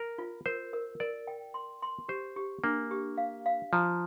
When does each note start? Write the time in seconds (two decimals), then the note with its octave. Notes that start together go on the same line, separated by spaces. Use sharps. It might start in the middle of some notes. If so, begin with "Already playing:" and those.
Already playing: A#4
0.18 F4
0.46 A#4 C5
0.73 A#4
1.00 A#4 D5
1.27 G5
1.54 C6
1.82 C6
2.08 G4 C5
2.36 G4
2.64 A#3 D4
2.91 G4
3.18 F5
3.46 F5
3.73 F3 A#5